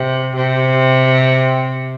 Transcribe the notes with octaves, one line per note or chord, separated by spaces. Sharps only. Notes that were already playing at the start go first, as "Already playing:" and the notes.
Already playing: C3
C3